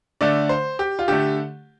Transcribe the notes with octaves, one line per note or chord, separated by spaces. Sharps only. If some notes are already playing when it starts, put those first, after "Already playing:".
D3 A3 D5
C5
G4
F4
D3 A3 G4